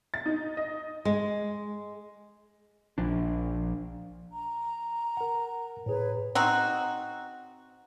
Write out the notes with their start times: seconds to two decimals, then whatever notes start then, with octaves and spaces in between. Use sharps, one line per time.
0.14 A6
0.26 D#4
0.57 D#5
1.05 G#3
2.98 A#1 F3 D4
4.31 A#5
5.17 A#4 F#5
5.86 A2 G#4 B4 C#5
6.35 C4 D#4 F#4